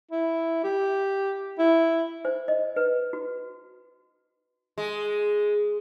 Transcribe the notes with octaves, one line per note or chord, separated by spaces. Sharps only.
E4
G4
E4
C5
D#5
B4
F#4
G#3